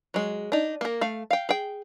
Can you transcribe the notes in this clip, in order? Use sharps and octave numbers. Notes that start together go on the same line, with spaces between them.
F#3 G#3
D4 D#4
A#3 A#4
A3 F5
F5 G5
G#4 G5